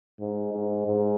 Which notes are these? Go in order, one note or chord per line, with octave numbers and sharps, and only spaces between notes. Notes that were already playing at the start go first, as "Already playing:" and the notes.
G#2
G#2
G#2